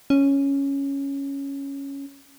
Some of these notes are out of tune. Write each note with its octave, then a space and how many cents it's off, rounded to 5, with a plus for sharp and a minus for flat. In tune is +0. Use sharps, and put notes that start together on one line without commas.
C#4 +0